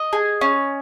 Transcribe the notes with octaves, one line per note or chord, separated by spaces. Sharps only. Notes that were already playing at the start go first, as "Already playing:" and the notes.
Already playing: D#5
G#4
C#4